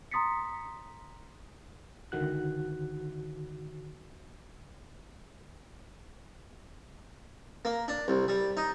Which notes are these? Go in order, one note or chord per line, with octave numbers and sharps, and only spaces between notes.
A#5 C6 D#6 A6 B6 C#7
C#2 D3 D#3 F#4 F#6
A#3
D4
C2
G3
D#4